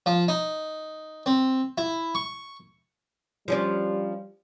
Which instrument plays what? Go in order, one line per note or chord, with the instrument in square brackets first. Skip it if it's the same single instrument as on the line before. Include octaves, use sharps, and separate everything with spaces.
[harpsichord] F3
D#4
C4
E4
C#6
[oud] F3 C#4 D4 [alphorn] G3